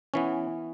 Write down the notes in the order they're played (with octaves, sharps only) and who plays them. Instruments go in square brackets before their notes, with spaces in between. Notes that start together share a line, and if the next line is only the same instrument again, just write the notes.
[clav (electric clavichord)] E3 B3 C#4